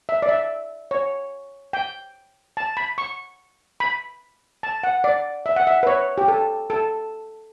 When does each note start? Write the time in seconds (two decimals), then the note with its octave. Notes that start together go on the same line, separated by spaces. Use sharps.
0.09 E5
0.22 D5
0.29 E5
0.91 C#5
1.73 G5
2.57 A5
2.77 B5
2.98 C#6
3.80 B5
4.63 A5
4.83 F#5
5.04 D5
5.46 E5
5.56 F#5
5.67 E5
5.83 B4
5.87 C#5
6.18 G4
6.28 A4
6.70 A4